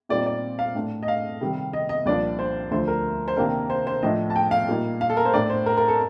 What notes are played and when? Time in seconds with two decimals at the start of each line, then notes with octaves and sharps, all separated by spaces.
0.09 A#2 G3 C4 D#4 D5
0.26 D5
0.59 F5
0.75 A2 A3 D4
1.03 D#5
1.08 F5
1.41 C3 D#3 G3
1.73 D#5
1.89 D#5
2.05 C2 A#2 F3 A#3 D4 D5
2.39 C5
2.71 D2 D3 F3 A3 C5
2.88 A#4
3.28 C5
3.37 C3 D#3 A#3 D4 A#4
3.70 C5
3.87 C5
4.03 A2 F3 A3 D4 D#5
4.30 A5
4.36 G5
4.51 F5
4.68 A#2 G3 A#3 D#4
5.01 F5
5.10 A4
5.17 A#4
5.25 C5
5.34 A2 A3 D4 D5
5.50 C5
5.66 A#4
5.77 A#4
5.88 A4